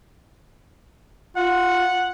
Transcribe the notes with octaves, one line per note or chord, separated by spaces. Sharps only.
F4 F#5